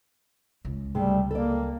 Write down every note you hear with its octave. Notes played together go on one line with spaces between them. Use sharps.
C#2
C3 G3 A3 G#4
A#3 A4 D5